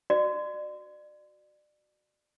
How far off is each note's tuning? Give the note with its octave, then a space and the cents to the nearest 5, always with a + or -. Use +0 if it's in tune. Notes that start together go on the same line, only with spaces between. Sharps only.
F#4 +0 D5 +30